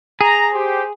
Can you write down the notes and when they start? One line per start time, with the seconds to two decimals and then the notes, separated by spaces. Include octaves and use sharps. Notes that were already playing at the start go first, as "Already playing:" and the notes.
0.21 G#4 A#5
0.54 G4 C5